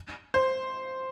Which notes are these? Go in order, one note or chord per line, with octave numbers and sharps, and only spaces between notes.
C5